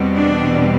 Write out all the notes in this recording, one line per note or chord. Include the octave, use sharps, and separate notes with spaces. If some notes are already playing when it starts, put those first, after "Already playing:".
Already playing: E2 B2 G3 C4
D4